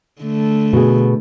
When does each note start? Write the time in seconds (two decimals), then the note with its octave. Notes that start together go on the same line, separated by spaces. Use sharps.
0.22 D3 A3
0.73 B2 G#4